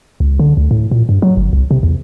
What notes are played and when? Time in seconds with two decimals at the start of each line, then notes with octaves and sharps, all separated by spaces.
0.20 C#2
0.39 D3
0.57 D2
0.71 A2
0.91 A#2
1.09 G2
1.22 F#3
1.37 G1
1.53 C2
1.71 C3
1.83 E2